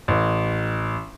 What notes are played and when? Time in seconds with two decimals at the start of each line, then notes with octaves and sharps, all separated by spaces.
0.08 A1